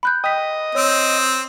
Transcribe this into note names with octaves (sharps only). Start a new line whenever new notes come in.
B5 F#6 G6
D#5 G5 B6
C4 C#5 E6 D7